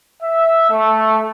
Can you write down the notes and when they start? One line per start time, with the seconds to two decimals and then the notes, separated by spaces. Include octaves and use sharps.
0.23 E5
0.70 A3